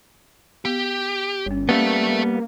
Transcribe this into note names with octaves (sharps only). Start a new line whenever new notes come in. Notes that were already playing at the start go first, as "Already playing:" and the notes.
B3 G4
G1 G3 C#4
G3 A#3 B3 C#4 A4 E5 F5